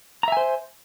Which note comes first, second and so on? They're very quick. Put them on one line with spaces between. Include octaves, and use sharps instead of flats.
A#5 E5 G#5 C5